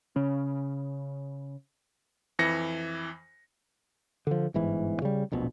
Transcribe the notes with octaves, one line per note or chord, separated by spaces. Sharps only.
C#3 C#4
F2 E3 A#6 C#7
D3 F3
G1 G#2 E3
C#3 G3
D1 A#1 B2